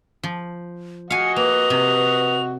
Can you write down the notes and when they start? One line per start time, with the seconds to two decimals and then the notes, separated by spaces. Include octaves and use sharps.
0.23 F3
1.10 F#4 D#5 F5 F#5 G#5 C#7
1.36 A#3 B4 F7
1.70 C3